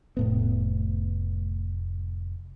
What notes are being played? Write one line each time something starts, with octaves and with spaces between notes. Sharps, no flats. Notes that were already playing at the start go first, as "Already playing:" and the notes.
F1 A2 B3